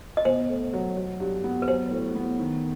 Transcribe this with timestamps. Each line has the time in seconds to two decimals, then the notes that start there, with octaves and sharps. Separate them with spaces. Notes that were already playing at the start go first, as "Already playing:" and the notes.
0.17 D#5
0.25 B2 C5
0.49 A3
0.73 F#3
0.97 F#3
1.20 G2
1.44 B3
1.62 B4
1.68 F#3 C5
1.91 A2
2.15 B3
2.39 D#3